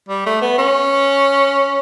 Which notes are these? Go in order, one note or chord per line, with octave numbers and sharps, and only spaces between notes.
G3
A3
B3
C#4